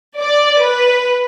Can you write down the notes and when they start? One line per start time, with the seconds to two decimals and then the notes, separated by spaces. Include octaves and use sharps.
0.18 D5
0.62 B4